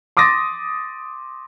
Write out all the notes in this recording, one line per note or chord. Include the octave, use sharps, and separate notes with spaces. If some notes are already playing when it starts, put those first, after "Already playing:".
C6 D6 D#6 A6 A#6